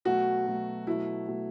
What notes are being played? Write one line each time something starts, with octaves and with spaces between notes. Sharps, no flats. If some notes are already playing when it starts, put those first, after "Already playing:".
B2 F#3 A3 F#4
B2 F#3 A3
B2 F#3 A3 E4
B2 F#3 A3